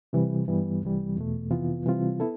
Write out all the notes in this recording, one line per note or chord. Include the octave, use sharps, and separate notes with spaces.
C3 E3 G3
G2 E3 G3 B3
C2 C3 E3 G3
E2 B2 A3
F2 C3 E3 B3 F4
C3 E3 G3 C4 F4
B3 E4 A4